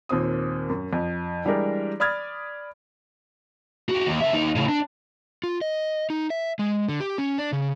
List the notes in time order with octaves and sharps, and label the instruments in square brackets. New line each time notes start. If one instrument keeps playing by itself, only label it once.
[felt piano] D#2 A#2 C4 D#6
F#2
F2
E3 G3 G#3 D4 G4 A#4
D5 B5 D#6 F6 G#6 A6
[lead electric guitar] F#4 G4
D#2
C#3 E5
D#2 D#4
A2 C#3
D4
[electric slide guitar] F4
D#5
D#4
E5
G#3
D3
G4
C#4
D4
C#3